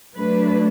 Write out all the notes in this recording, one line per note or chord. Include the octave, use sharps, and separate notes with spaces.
F#3 A3 D4 B4